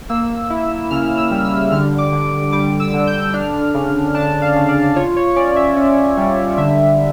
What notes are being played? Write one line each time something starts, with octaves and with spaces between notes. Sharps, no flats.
A#3 E6
E4
C#3 F6
E6
G3
E6
D3 F6
D6
D3
G3 D6
E6
D3
G6
D4 F6
C#3
D4 A5
F5
C#3
D5
F4 C#5
C#5
C#4 D5
E5
C#4
G3
D3 E5